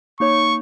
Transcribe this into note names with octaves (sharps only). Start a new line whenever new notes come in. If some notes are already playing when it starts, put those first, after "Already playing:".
A#3 D#4 C#5 C#6